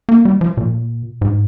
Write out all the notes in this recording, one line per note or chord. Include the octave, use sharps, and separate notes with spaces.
A#3
G3
F3
A#2
G#2